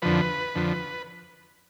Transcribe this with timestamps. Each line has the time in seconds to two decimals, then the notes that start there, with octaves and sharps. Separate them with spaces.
0.02 F2 D3 F3 B4
0.55 F2 D3 F3